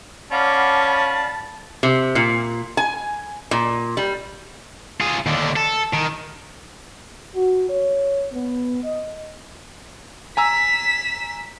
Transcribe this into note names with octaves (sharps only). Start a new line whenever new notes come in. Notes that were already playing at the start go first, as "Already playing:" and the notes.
C#4 D5 F5 F#5 A5 B5 D6 F6
C3
A#2
G#5
A#2
G3
F4 G#4
D#2 D3
A4
D#3
F#4
C#5
B3
D#5
G#5 A#5 E6 B6 E7